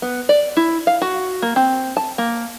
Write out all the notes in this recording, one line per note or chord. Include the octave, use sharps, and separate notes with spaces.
B3
D5
E4
F5
F#4
A#3
C4
A5
A#3